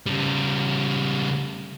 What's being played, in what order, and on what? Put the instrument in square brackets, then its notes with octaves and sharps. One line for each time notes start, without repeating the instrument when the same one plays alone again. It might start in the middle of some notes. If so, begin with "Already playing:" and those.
[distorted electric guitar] C#3 G3